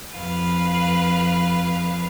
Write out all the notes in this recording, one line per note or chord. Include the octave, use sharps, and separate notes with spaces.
F2 B4 F5